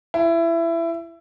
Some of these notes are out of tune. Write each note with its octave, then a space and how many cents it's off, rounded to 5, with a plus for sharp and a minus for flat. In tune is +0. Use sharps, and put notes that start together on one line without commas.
E4 +20